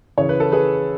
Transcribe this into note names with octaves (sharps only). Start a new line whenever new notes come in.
C#3 E3 C#5
B4
A4
G#4 B4